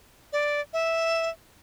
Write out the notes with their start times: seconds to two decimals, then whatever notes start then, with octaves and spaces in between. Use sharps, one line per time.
0.33 D5
0.73 E5